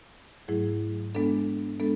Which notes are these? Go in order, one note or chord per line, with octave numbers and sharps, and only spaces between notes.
G#2 F#3 A3 E4 G#4
G#3 B3 D4 A4
G#3 B3 D4 A4